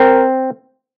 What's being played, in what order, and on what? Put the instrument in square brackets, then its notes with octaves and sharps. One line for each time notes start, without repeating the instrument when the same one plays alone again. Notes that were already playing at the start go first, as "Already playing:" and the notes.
Already playing: [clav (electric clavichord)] C4 [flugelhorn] A#4